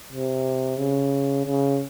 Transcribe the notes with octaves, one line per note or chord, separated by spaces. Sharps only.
C3
C#3
C#3